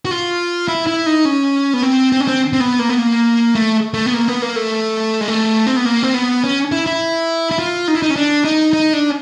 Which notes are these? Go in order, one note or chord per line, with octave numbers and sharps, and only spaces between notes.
F#4
F4
E4
E4
D#4
C#4
B3
C4
C4
C#4
C4
C4
B3
A#3
B3
A#3
A3
A3
B3
A#3
B3
A#3
A3
G#3
A3
C4
B3
A#3
C4
B3
C#4
E4
E4
E4
F4
D#4
E4
D#4
C#4
D4
D#4
D#4
D4